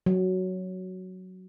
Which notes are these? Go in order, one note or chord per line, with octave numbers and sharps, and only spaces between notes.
F#3